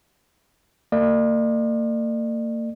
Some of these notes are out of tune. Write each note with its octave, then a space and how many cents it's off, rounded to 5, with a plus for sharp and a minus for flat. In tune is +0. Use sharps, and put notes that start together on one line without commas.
A#3 -40 D5 +40